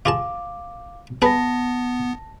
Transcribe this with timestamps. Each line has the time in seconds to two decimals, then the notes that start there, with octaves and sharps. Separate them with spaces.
0.06 F4 G#4 F5 A5 D6
1.22 B3 G#4 B4 A5 A#6